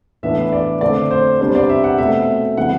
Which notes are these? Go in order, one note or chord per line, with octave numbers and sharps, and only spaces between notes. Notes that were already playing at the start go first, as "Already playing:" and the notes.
A2 E3 B3 D4 E5
D5
D3 A3 C4 D5
C5
C3 G3 B3 D4 C5
D5
E5
F#5
B2 A3 C4 E5
C3 E3 G3 F#5